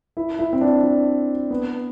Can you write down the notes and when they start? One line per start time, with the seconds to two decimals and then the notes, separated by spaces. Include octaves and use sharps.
0.17 E4
0.39 E4
0.53 C4
0.61 D4
0.83 D4
1.51 B3